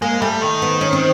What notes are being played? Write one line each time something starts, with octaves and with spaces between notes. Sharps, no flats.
G#3 A#3
G3 A3
D#3
B3
C#4
C4